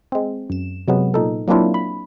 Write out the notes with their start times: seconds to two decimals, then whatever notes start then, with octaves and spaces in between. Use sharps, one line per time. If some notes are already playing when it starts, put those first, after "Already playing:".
0.12 G#3 C4
0.50 F#2 E7
0.88 C3 F#3 G#3 B3
1.14 A#2 D#4 A4
1.48 F#3 A#3 C4 D4 E4 F4
1.74 B5